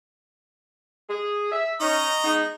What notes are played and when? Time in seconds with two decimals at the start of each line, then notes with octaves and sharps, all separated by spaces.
1.10 G#4
1.52 E5
1.80 C#4 D#4 D#5 A#5 C#6
2.24 G#3 B3 D#4